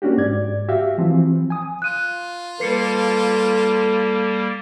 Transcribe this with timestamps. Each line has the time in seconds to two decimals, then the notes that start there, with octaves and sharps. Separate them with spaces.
0.02 A#3 C#4 D4 F#4 G4
0.17 G#2 D5 G#6
0.69 F#4 G4 E5 F5
0.98 E3 F3 C4
1.50 G#5 D#6
1.82 F4 F#6 D#7
2.60 G3 A#3 A4 B4 C7 C#7